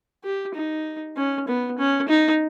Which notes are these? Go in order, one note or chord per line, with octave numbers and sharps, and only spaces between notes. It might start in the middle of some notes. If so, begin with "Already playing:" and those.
G4
D#4
C#4
B3
C#4
D#4